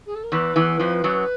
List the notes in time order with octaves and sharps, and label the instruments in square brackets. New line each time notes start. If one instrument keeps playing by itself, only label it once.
[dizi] G#4
A4
A#4
[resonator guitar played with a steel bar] E2 E3 [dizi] B4
[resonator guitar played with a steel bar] E2 E3
F2 F3
F#2 F#3